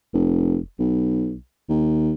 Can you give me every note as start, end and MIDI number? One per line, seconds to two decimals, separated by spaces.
0.14 0.58 29
0.79 1.36 35
1.69 2.13 39